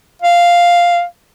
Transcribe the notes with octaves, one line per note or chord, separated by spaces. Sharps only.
F5